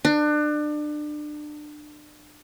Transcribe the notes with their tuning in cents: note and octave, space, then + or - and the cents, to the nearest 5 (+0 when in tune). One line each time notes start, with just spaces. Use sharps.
D4 +30